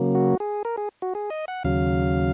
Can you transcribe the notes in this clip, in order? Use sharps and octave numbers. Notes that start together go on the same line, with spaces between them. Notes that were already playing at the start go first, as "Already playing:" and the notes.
Already playing: C#3 F#3 A#3
F#4
G#4
A#4
G#4
F#4
G#4
D#5
F#5
D#2 C#3 F#3 F5